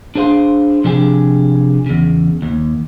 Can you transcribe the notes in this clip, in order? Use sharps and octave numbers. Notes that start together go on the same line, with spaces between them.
D4 G#4 C5 F5 C6
C3 F3 D4 G4 G#4
E2 C#3
D#2